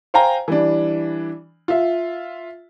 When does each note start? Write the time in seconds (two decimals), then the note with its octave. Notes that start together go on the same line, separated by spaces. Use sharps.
0.14 C5 F5 G5 G#5 A#5
0.48 E3 G3 D4
1.68 F4 E5